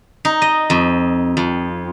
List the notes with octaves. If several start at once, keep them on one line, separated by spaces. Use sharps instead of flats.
D#4
D#5
F2
F2